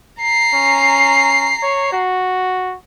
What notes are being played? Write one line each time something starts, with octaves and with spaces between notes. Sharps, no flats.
A#5 C7
C#4
C#5
F#4